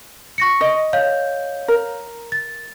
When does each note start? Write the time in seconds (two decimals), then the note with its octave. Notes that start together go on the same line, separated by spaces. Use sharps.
0.38 C#6 A#6 C#7
0.61 D#5
0.93 C#5 F5 G6
1.68 A#4
2.32 A6